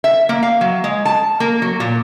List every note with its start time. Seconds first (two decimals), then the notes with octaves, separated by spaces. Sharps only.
0.04 E5
0.29 A#3
0.43 F5
0.61 F#3
0.84 G#3
1.05 A5
1.40 A#3
1.62 F#3
1.80 A#2